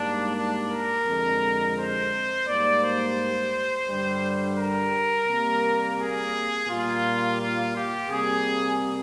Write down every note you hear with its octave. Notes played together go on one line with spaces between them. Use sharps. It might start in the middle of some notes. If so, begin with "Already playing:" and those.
Already playing: G#2 G3 A#3 D4
D4
A#4
F2 D3 G#3
C5
G#2 G3 A#3 D5
C5
G2 D3 G3
A#4
C3 G3 A#3
G#4
A#2 G3 A#3 F4
F4
G4
C3 G3 A#3 G#4